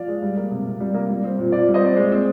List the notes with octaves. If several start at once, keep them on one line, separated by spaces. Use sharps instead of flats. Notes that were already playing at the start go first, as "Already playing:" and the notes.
Already playing: F3 D5 F5
G#3
G3
A#3
C3
C3
G3
A#3
G3
C4
A#2
A#2 D5
G3
C5 D#5
C4 D5
G#3
C4